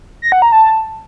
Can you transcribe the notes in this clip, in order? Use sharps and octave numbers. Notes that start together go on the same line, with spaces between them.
A#6
F#5
A#5
A5